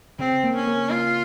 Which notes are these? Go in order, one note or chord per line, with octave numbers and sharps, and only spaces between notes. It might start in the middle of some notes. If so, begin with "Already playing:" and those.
C#3 C4
A#3
C#4
A#3
A#3 F4